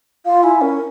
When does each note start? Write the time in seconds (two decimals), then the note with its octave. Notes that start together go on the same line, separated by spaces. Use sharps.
0.25 F4 F5
0.43 E4 G#5
0.61 C#4 A#4